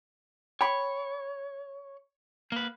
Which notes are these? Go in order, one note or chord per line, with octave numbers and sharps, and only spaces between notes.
C#5 G5 B5
A#3 B4